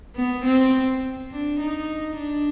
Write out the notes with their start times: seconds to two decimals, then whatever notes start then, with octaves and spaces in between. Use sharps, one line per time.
0.16 B3
0.44 C4
1.31 D4
1.60 D#4
2.18 D4